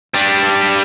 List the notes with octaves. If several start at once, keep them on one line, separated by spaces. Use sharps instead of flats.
G3 D4